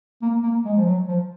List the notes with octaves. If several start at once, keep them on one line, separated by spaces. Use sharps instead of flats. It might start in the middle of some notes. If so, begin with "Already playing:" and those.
A#3
A#3
G#3
F3
F#3
F3